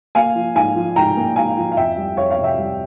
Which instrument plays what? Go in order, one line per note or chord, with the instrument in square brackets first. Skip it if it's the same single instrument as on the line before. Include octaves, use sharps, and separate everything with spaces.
[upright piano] A#3 F5 G#5
F3
G#2 F5 G#5
F3
G#2 G5 A#5
A#3
G#2 F5 G#5
F3
F5
F2 E5 G5
G3
F2 C#5 F5
C#5 F5
C3
E5 G5
G3